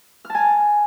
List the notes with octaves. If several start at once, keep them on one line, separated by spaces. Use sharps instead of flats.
F6
A5
G#5